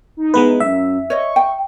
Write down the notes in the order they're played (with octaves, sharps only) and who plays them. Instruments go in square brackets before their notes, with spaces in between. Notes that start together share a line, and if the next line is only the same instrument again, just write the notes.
[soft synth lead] D#4
[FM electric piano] G#3 B3 B4 [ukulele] E4
[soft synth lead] F#2 [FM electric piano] E5
[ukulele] C#5 D#5 [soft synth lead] C#6
[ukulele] G5